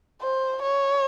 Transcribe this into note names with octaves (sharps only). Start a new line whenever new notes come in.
C5
C#5